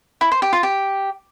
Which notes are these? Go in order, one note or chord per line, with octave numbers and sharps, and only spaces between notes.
E4
C5
G4
F4
G4